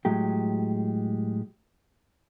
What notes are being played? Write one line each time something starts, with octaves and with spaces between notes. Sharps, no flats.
A2 F#3 G#3 G4